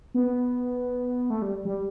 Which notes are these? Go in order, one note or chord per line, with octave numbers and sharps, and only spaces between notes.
B3
A3
G3
G3